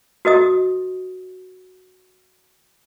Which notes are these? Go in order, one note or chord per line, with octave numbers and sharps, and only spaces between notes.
F#4 A#4 D#5 D#6